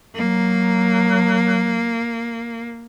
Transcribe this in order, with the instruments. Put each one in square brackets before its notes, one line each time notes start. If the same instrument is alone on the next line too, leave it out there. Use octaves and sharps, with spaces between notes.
[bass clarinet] F#3 [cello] A#3